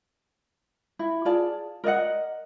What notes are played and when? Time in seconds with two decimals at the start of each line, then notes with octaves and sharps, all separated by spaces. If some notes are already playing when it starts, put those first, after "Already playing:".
0.99 E4
1.25 F4 G#4 D5 A5
1.84 A#4 D5 D#5 F#5